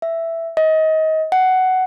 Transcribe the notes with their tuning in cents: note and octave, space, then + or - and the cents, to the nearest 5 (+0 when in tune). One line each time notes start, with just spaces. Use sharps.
E5 +5
D#5 +25
F#5 +10